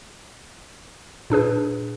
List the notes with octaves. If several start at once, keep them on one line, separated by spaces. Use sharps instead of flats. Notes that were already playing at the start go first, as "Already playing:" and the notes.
A#2 D4 G#4 B4